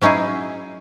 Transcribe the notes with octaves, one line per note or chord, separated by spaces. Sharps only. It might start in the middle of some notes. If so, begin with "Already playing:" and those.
F#3 C#4 D#4 E4 G#4